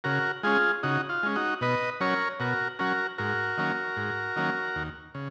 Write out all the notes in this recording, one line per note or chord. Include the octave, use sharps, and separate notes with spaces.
C#3 F#4 A#4
G#3 C#4 F4 G#4
C#3 D#4 F#4
F4
G#3 C#4
D#4 F#4
B2 B4 D#5
F#3 C#4 A#4 C#5
B2 F#4 A#4
F#3 C#4 F#4 A#4
G#2 F#4 A#4
D#3 F#3 A#3 C#4
G#2
D#3 F#3 A#3 C#4
D#2
C#3